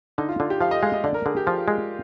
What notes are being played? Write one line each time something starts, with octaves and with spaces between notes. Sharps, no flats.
D3 D#4
F4
D3 F4
G4
F3 F5
D#5
G#3 F5
D#5
D3 D5
A#4
D3 G#4
G4
F3 F4
G#3